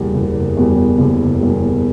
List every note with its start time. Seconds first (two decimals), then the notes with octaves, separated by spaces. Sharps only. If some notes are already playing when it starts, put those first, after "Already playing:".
Already playing: F#1 E2 B2 G3
0.14 F#1
0.57 E2 B2 G3
0.98 F#1
1.41 E2 B2 G3